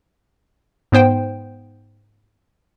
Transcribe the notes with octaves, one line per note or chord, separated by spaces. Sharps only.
G#2 B3 C5 G5